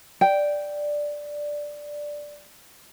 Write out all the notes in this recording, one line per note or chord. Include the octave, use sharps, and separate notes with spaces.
D5 G5